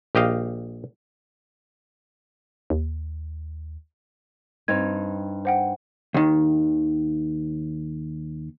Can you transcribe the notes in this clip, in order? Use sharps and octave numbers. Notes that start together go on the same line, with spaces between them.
A#1 G4 D#5 F5
D#2
G2 C4 D#4 G#6
C5 F#5 G5
D#2 D#3